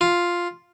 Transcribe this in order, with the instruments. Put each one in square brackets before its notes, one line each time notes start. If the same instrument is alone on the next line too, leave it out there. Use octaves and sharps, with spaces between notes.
[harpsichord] F4